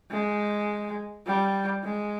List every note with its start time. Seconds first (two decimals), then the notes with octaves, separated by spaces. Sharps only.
0.11 G#3
1.26 G3
1.84 G#3